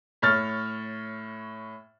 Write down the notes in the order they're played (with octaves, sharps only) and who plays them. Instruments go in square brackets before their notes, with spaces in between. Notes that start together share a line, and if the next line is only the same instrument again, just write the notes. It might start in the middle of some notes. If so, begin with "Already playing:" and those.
[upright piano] A2 C#5 F6 A6